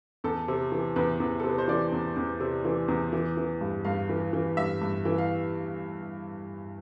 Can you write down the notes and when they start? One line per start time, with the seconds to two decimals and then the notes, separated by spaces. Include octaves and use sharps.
0.24 E2 A4
0.48 C3
0.72 E3
0.96 E2 B4
1.20 E2
1.40 C3 A4
1.49 B4
1.58 C5
1.68 E3 D5
1.92 E2
2.16 E2
2.40 C3
2.65 E3
2.88 E2
3.13 E3
3.37 E3
3.61 G2
3.85 G2 F5
4.10 E3
4.33 E3
4.57 G2 E5
4.82 G2
5.05 E3
5.18 F5